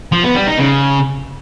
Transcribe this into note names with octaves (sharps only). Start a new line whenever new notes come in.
F3
B3
G3
D#4
C#3